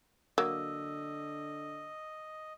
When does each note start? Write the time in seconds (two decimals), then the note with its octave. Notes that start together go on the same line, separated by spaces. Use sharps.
0.38 D3 F#3 A#3 D#5 E6